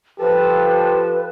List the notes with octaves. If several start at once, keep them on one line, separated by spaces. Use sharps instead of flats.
F3 G4 A4 B4